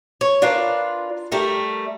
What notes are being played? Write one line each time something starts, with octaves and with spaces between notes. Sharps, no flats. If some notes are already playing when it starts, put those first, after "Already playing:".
C#5
D4 F4 A#4 B4
G3 A3 A#4